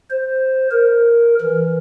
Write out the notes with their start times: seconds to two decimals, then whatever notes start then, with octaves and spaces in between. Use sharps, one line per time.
0.10 C5
0.71 A#4
1.41 E3